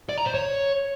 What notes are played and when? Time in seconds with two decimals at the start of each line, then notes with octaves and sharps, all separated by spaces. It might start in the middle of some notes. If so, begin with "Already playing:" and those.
0.09 D5
0.18 A#5
0.26 C5
0.34 C#5